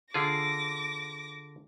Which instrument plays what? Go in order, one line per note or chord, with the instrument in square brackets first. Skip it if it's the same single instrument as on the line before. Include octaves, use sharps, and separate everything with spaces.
[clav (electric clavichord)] D3 F4 G#4 [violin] D6 A#6